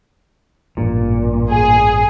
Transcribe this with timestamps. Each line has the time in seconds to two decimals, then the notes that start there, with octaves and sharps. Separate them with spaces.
0.77 A1 G2 A#2
1.50 G#4